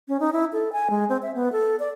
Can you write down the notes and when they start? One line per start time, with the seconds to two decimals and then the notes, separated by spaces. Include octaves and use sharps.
0.08 C#4
0.20 D#4
0.33 E4
0.53 A4
0.72 G#5
0.90 G#3
1.09 C4
1.22 E5
1.35 B3
1.52 A4
1.80 D5